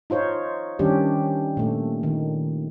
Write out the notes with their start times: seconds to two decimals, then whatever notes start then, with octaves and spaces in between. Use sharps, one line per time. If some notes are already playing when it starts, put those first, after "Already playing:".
0.10 D#4 F4 C5 C#5
0.79 D#3 G3 C#4 D4 G4
1.57 A#2 A3
2.03 D#3